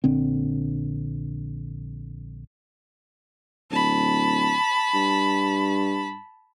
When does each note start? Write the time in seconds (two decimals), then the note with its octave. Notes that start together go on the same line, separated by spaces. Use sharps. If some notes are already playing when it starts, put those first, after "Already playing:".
0.04 A#1 D3 C4
3.71 D1 A5 B5
4.94 G2